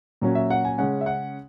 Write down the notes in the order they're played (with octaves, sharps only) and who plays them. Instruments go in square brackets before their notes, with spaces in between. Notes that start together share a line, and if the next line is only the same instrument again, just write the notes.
[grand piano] A#2 F#3 C#4
E5
F#5
G#5
C#3 G#3 C#4 F#5
E5
F#5